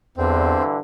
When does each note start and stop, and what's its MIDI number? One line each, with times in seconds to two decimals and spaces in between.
0.17 0.61 40
0.17 0.77 43
0.17 0.77 50
0.17 0.77 52
0.17 0.62 60